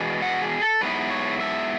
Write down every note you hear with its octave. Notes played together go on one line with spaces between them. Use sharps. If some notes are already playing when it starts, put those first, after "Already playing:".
Already playing: E2 B2 G#3 D4
F#5
G#4
A4
G#2 F#3 B3 E4 B4
C#5
E5